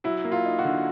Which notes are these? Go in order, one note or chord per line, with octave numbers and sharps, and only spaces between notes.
F#3 E4
A#3
F4
D#4
F#4
D3